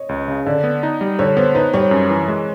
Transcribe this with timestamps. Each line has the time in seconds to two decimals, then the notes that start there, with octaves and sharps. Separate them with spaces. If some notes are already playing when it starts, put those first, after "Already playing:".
Already playing: C#5 D#5
0.09 C#2
0.28 C#3
0.46 D3 D5
0.64 B3
0.83 D#4
1.01 G3
1.19 D3 C#5
1.37 B3 C5
1.55 D#4 B4
1.73 G3 C#5
1.91 F#2
2.09 E3
2.28 G#3